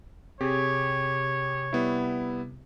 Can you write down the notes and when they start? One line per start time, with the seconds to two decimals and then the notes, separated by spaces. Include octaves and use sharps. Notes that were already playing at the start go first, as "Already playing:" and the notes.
0.41 C3 G4 G#4 C#5
1.73 G3 B3 E4